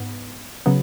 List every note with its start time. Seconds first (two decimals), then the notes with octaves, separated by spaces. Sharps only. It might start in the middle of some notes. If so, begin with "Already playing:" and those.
Already playing: G#2 B3
0.66 C#3 F#3 B3